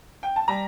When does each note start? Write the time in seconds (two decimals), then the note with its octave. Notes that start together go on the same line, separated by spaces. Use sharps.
0.23 G5
0.36 A5
0.48 G3 A#5